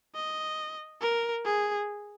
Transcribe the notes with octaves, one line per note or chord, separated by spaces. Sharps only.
D#5
A#4
G#4